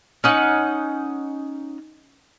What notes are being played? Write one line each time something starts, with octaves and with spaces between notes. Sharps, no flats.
C#4 D#4 F#5